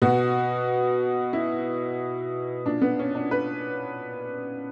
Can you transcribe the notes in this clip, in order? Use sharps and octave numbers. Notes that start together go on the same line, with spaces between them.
B2 F#4
E4
A#2 D4
B3
C#4
D4
B4